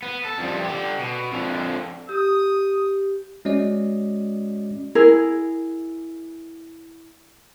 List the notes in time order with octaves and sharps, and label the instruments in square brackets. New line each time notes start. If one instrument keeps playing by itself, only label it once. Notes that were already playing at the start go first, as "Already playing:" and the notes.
[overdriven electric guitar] B3
A4
F2 G3
D3 G4
B2
F2 D3
[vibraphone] G4 [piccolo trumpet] D#6
[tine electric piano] G#3 C#4 F#4 D5 D#5
[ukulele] E4 G#4 A#4